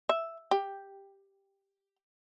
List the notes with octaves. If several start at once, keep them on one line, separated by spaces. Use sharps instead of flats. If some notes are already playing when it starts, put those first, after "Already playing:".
E5
G4